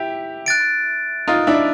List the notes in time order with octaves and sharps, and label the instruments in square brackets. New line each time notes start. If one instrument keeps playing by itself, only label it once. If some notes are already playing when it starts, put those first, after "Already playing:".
Already playing: [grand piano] E4 G4
[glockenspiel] F#6 A6 D7
[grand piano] D#4 F4
D4 E4